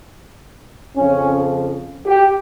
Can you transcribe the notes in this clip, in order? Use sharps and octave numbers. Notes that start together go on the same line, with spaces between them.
F2 C#3 F3 C#4
G4